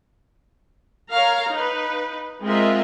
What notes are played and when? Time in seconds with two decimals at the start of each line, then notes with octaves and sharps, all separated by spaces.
1.13 A#4 C#5 F5 A#5
1.50 D#4 B4
2.44 G#3 C4 F4 A#4 D#5 E5